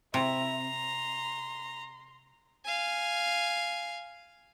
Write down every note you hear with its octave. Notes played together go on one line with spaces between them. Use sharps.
C3 E4 A#5
C6
F5 G#5